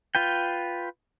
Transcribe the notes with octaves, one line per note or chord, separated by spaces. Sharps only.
F4 B4 G5